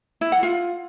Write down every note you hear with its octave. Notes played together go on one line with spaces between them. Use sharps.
E4
F#5
F4